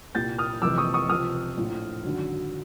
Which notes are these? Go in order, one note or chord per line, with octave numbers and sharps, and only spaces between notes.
C2 A#2 G3 G6 A6
D#6 F6
F2 C3 E3 G#3 D6 E6
C#6 D#6
C#6 D#6
C#2 C3 F3 D#6 F6
A#1 A2 F3
G#1 F#2 D3 F#3